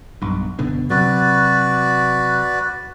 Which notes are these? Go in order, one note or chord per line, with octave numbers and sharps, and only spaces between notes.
B1 G2
F#1 B2 D3
C3 F#3 F#4 B4 D5